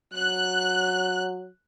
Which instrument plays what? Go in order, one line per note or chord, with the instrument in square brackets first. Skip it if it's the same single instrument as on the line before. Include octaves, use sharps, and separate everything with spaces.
[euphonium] F#3 [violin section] F#6